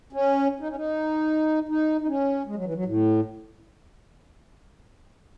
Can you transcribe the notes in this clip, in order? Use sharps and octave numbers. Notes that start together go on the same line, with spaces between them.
C#4
D#4
C#4
D#4
D#4
D#4
C#4
G#3
F#3
E3
F#3
A2